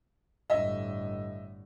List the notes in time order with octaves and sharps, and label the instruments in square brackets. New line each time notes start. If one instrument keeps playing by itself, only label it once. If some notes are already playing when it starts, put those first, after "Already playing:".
[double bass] G1 A2 [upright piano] D#5 E5